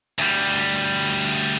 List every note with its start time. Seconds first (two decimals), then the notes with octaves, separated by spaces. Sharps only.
0.19 D2 G3